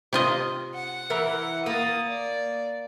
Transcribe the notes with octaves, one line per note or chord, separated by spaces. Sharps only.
C3 F4 D#5
F#5
E3 A#4
A#3 D#6 A6
D5